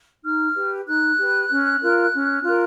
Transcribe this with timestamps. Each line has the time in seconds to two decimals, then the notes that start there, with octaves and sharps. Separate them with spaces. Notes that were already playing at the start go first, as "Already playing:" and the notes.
0.24 D#4 F6
0.56 G4 B4
0.87 D#4 F#6
1.19 G4 B4
1.50 C#4
1.81 F4 A#4
2.13 C#4
2.44 F4 A#4